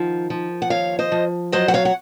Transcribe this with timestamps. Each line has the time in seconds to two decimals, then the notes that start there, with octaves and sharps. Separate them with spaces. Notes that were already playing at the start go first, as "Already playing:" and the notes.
Already playing: D#3 F3 F#5
0.30 F3
0.62 F#5
0.70 D#2 C#5 F5
0.99 C5 D#5
1.12 F3
1.52 F#3 C5 D#5
1.68 F#5
1.74 C#5 F5
1.85 F#5